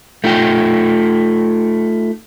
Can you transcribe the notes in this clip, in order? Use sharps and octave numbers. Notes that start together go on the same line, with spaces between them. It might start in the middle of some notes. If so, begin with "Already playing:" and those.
A3 D#4 F4 G5